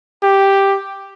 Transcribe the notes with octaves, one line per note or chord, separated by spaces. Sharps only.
G4